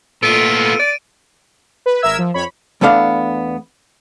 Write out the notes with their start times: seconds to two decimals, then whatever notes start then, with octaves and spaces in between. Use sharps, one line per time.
0.23 A#2 A3 B3 F4 A4 D7 D#7
0.79 D5
1.86 B4
2.02 G#1 A#4 E5 E6 G#6
2.18 F3
2.34 F2 C#5 B5
2.81 E2 A3 B3 D4 F5